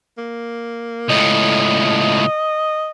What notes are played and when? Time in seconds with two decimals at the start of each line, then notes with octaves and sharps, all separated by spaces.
0.18 A#3
1.09 C#2 A2 D#5